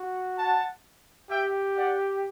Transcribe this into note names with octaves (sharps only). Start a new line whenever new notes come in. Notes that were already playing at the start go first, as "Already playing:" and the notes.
Already playing: F#4
F#5 A5
G4 E5 G5
D5 F#5